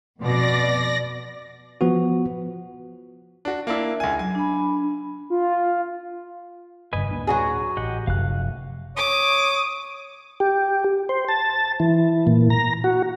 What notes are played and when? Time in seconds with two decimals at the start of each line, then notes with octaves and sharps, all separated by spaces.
0.20 F2 B2 D5 A#6
1.81 F3 B3 F#4
3.45 D4 F#4
3.67 A#3 D4 E4 E5
4.00 C#2 G#5
4.19 F#3 G#5
4.35 D4 B5
5.30 F4
6.93 F#1 G2 C#3 B4 D#5 G#5
7.11 D1 A#3 D4
7.27 F#3 F#4 G#4
7.77 A1 G4 D#5 F#5
8.07 F1 F#2 F5 F#6
8.97 C#5 D6 D#6
10.40 G4
11.09 C5
11.28 A5
11.80 E3
12.27 A#2
12.50 A#5
12.84 F#4